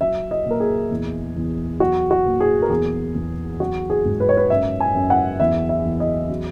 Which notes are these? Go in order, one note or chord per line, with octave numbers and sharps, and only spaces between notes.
F#3 E5
D#5
A#2
A#4
G#4
E2
E2
F#3 F#4
F#4
A#2
G#4
A#4
E2 G#4
E2
F#3 F#4
G#4
G#2
B4
C#5
B4
F#2 E5
G#5
F#2
F#5
E2 E5
E5
E2
D#5
F#3